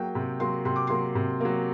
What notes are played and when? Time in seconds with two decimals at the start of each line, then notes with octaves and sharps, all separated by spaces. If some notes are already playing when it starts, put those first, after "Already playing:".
Already playing: F#3 A#3 G5
0.15 C3
0.40 F#3 A#3 C6
0.65 C3 C6
0.76 D6
0.87 F#3 A#3 C6
1.15 C3
1.40 F#3 A#3